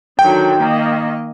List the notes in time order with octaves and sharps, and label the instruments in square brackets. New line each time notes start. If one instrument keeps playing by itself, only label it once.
[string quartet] D3 D#3 F#3 [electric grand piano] G5
[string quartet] D#3 A#3 D#5